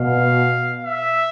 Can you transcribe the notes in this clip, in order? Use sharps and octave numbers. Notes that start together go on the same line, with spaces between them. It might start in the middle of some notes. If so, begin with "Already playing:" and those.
Already playing: B2 F5
E5